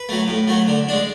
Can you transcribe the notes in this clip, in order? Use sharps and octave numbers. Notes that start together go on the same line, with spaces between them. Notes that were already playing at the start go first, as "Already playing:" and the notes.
Already playing: B4
F#3 A3
A2
F#3 A3
D3
G#3 D4